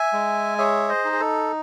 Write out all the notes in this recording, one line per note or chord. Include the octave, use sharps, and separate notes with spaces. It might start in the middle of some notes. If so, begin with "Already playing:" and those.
Already playing: E5 G#5
G#3
G#4 C#5 E5
C5 D#5
D#4
G#4
A4